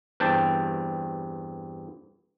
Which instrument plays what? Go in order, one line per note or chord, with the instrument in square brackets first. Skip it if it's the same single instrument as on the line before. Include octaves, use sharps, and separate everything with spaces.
[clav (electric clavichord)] E2 G2 C4 G5 A5